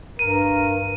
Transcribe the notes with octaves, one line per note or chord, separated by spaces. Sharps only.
G2 A#4 D#7